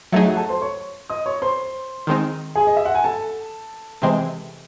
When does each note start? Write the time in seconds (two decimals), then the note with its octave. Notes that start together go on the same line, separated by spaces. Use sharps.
0.12 F#3 A3 D#4 G#4 E5
0.25 F#4 F#5
0.37 A4 A5
0.49 C5 C6
0.62 C#5 C#6
1.10 D#5 D#6
1.26 C#5 C#6
1.42 C5 C6
2.07 D#3 G#3 C4 D#4
2.55 G#4 G#5
2.67 D#5
2.77 E5
2.86 F#5
2.95 G#5
3.04 A4 A5
4.02 C3 E3 G#3 C4